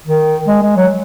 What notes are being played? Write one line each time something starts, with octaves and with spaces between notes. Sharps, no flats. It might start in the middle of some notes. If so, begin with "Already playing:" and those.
D#3
G#3
G#3
F#3